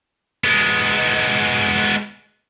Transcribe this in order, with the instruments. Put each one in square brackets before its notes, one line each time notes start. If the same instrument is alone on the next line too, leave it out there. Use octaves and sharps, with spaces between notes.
[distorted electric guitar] G#3 B3